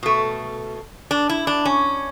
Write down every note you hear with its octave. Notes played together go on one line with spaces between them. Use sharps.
B2 A3
D4
E4
D4
C#4